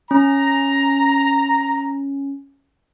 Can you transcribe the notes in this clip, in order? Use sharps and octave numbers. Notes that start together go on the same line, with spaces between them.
C#4 A#5